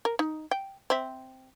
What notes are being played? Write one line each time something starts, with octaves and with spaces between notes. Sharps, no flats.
A#4
D#4
G5
C4 E5